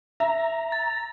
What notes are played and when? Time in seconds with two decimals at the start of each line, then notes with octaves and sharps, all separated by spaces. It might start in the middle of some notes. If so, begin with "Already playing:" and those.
0.20 E5 A#5
0.72 A6